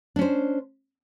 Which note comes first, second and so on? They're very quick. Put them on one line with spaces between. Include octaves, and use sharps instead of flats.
D4 C#4 C5